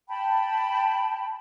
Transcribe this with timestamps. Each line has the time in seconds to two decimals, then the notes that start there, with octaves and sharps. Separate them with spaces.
0.09 G5 A5 B5